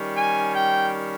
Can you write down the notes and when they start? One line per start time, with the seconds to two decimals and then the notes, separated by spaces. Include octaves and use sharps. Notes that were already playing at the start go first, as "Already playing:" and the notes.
Already playing: D#3 G3 C#4
0.16 G#5
0.52 G5